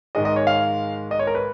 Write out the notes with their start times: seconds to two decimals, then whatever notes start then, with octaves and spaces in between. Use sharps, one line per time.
0.15 G#2 D#3 G#3 D#4 D#5
0.25 D#5
0.36 C#5
0.47 F5
1.11 D#5
1.19 C#5
1.27 A#4
1.35 B4